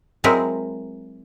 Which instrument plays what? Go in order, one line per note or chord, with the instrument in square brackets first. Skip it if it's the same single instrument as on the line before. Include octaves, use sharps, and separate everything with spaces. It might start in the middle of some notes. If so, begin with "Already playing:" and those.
[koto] F#3 G#3 C4 E4 A#4